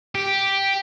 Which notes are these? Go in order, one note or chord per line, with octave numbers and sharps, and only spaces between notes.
G4